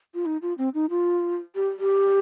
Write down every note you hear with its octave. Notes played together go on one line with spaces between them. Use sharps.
F4
D#4
F4
C4
D#4
F4
G4
G4